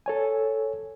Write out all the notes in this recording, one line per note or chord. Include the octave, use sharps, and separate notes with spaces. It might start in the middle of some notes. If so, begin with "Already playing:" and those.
A4 C#5 G#5